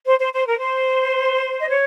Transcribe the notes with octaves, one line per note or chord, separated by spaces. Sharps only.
C5
C5
C5
A#4
C5
D#5
C#5